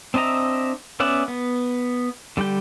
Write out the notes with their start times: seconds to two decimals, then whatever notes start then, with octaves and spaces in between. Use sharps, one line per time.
0.14 C4 D4 D#5 E5 A#5
1.00 B3 C#4 D5 E5 F#5
1.28 B3
2.37 D3 G3 G4 G5